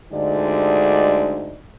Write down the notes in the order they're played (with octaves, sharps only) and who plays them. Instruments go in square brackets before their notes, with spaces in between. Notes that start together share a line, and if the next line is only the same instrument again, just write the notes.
[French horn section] D2 G2 D3 G#3 D#4 D5